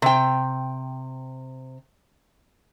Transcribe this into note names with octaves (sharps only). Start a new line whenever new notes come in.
C3 G5